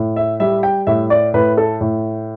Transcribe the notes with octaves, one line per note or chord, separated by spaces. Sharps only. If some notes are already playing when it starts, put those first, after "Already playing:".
Already playing: A2
E5
G3 E5
G5
A2 E5
D5
A2 B4
A4
A2